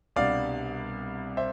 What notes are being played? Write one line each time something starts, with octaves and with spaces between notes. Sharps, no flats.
C2 B2 G3 B3 D4 D5 F5
C5 E5